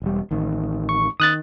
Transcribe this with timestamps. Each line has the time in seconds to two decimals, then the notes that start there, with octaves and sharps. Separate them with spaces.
0.02 E1 G3
0.31 A1 D#3
0.89 C#6
1.20 D#3 D#6 F#6 A6